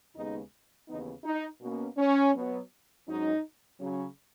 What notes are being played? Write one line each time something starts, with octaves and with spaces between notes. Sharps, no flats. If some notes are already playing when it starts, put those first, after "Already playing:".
D#2 C#3 G#3 B3 D#4
D#2 C#3 E3 B3 D#4
D#4
B2 A#3 C#4
C#4
B2 F#3 B3
G#2 F#3 C#4 D#4
C#3 F#3 C#4